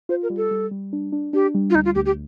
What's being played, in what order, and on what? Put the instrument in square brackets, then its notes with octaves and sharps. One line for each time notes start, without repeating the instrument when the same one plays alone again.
[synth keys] F4 [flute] C5
[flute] A#4
[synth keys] G3
[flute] A4
[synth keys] G3
G3
D4
D4
[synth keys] D4 [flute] G4
[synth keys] G3
[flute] F4
[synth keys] D2 [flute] D#4
[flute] F4
[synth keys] D2 [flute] G4
[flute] G4